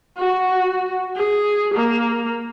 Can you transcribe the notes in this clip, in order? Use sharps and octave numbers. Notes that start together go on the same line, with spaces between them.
F#4
G#4
A#3